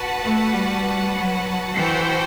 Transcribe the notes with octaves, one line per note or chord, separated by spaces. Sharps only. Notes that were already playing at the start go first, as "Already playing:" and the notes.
Already playing: F#4 B4 F#5 A5
A3
G3
F#3
E3 F#4 A4 C5 G5